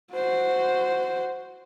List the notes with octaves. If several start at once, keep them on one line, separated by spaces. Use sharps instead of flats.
F#4 C5